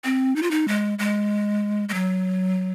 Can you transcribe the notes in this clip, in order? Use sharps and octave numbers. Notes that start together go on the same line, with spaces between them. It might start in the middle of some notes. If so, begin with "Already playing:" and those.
C4
D#4
F4
D#4
G#3
G#3
G#3
F#3